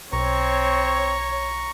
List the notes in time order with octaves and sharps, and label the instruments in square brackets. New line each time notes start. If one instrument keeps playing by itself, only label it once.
[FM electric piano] B1 [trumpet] C4 [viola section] C#5 [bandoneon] A#5 C#6